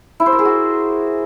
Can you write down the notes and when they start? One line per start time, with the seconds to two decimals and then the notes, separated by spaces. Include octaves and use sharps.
0.20 E4
0.26 C5
0.32 A#4
0.39 G#4
0.45 F#4